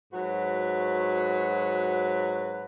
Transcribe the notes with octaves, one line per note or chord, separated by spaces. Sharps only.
G#2 F#3 F#4 B4